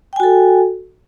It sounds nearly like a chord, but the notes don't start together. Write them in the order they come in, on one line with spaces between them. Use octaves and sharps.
G5 G#5 F#4 A4